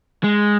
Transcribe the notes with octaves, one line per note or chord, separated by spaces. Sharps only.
G#3